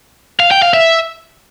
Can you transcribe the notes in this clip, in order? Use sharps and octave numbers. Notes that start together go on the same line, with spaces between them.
F5
G5
F5
E5